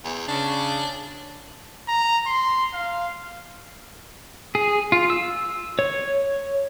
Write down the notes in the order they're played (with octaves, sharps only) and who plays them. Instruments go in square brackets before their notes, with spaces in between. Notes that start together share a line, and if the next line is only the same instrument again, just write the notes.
[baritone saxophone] E2
[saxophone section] C#3 [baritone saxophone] D4
[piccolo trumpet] A#5
C6
F5
[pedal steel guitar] G#4
F4
E6
C#5